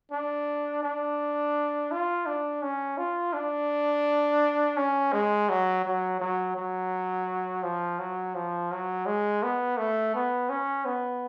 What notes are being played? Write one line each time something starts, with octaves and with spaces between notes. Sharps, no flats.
D4
D4
F4
D4
C#4
F4
D4
C#4
G#3
F#3
F#3
F#3
F#3
F3
F#3
F3
F#3
G#3
B3
A3
B3
C#4
B3